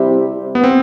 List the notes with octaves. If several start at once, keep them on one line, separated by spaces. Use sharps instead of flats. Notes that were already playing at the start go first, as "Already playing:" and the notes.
Already playing: C3 G3 C4 E4 G4
B3
C4